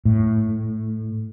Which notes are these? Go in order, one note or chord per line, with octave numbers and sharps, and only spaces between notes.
A2